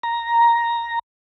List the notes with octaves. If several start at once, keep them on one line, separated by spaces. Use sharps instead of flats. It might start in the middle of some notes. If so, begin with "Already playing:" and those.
A#5